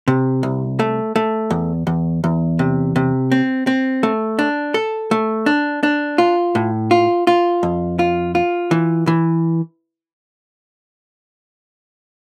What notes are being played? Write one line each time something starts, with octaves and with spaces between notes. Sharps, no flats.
C3
C2
A3
A3
E2
E2
E2
C3
C3
C4
C4
A3
D4
A4
A3
D4
D4
F4
A2
F4
F4
F2
F4
F4
E3
E3